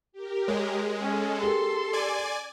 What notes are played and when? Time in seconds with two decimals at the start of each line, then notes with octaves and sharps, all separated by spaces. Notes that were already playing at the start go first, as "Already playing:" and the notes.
0.12 G4 A#4
0.48 G#3 C#5
1.01 C#4 A4
1.42 G4 G#4 A#4 C6
1.93 D5 G#5